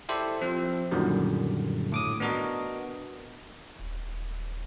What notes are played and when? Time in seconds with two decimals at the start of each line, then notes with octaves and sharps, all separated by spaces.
0.09 E4 G4 A4 C5 D5 E5
0.42 F3 C4
0.91 F#2 A#2 D3 D#3 F#3 G3
1.92 A2 D6 D#6
2.20 B3 D4 F#4 A#4 D#5
3.79 D#1